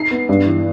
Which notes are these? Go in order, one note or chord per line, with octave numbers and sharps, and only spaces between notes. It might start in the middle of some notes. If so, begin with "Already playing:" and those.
Already playing: D#4 C7
B3
G2
E3